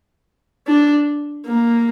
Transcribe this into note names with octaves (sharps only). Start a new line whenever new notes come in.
D4
A#3